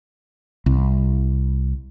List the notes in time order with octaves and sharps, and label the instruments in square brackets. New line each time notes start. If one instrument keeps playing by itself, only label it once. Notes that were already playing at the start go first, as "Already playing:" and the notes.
[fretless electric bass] C2